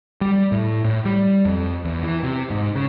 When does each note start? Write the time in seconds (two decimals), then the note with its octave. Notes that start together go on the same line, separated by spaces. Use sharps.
0.21 G3
0.52 A2
0.84 A2
1.05 G3
1.45 F2
1.85 E2
2.03 E3
2.23 C3
2.50 G#2
2.76 C#3